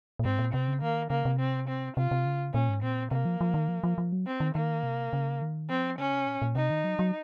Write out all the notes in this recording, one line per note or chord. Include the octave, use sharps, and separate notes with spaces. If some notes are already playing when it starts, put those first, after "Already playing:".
A#2
G#2 C4
A#2
C3 C4
C#3
D#3 A#3
C#3 A#3
C3
C4
C4
C3 F4
C3
C#3
A#2 C#4
G#2
A#2 C4
C3 A#3
F3
F3
D#3
F3
F3
F3
F#3
C4
D#3
D#3 A#3
C3
C#3
D#3
F3 C4
C#3 C#4
C3
A#2
A#2
C3 D#4
D#3
F#3
F#3